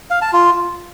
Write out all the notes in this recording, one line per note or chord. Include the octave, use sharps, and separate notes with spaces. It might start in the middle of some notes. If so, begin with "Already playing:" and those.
F5
A5
F4